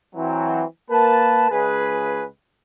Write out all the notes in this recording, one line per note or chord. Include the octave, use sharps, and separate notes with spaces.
E3 F#3 C4
A#3 A#4 B4 A5
C#2 G#4 B4